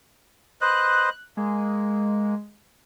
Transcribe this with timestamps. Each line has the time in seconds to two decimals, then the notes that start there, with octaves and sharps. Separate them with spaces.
0.61 B4 C5 D#5 F#6
1.37 G#3 A#3